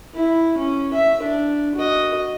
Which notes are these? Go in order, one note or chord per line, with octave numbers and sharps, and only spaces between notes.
E4
C#4
E5
D4
F#4 D#5